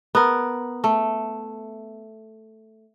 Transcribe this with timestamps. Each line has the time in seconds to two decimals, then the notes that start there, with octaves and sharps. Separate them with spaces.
0.15 B3 A#4
0.84 A3